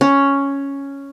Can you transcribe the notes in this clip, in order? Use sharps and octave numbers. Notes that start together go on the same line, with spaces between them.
C#4